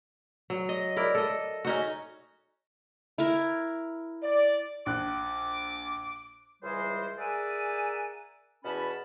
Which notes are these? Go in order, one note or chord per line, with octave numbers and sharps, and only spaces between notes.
F#3
D#5
E4 A#4 D5
A4 D#5
C#4 D#4 F#4
E4 A#4
D5
A#1 D6 F#6
C#2 E3 G3 G#3 C5
G#4 A#4 D5 E5 F#5 G#5
E2 B2 C#4 A5 B5